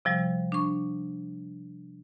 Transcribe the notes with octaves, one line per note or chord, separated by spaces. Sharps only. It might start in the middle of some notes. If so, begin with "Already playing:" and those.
C3 F3 G3
D4 C#6